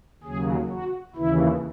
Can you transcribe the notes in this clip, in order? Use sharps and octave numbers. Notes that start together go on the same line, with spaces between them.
D#2 C#3 F#3 G#4
F#4
D#2 C#3 E3 E4